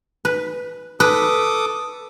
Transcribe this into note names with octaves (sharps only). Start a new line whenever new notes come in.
B4
A4 B4 D6 D#6